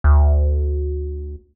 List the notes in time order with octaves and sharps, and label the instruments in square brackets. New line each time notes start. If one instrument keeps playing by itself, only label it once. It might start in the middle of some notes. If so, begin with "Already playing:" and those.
[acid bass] D2